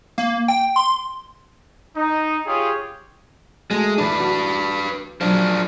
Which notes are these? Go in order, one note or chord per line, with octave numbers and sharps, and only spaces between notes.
A#3
G5
C6
D#4
F4 G4 G#4 C#5
G#3 A3 F#4 A4
E3 D4 E4 B4
F#4
F3 F#3 D4 C5